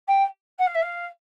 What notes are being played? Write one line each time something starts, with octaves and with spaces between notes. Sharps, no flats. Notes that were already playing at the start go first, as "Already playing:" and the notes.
G5
F#5
F5
E5
F5